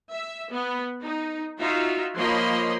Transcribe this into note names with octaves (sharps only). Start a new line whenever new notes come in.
E5
B3
D#4
D#4 F4 F#4 E5
F3 A#3 C#5 D#5 B5 C6